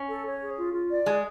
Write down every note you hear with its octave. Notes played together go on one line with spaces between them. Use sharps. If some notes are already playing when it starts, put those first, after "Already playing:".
Already playing: C#4
A4
C#5
G#4
F4
F4
D5
G#3 G#4